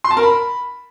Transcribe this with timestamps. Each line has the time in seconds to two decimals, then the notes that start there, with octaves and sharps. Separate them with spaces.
0.04 C6
0.11 A5
0.17 A#4
0.23 B5